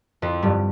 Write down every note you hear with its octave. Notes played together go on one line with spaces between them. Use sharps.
F2 F3
G2 G3